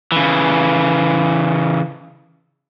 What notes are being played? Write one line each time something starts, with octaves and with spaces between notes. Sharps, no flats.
C#3 E3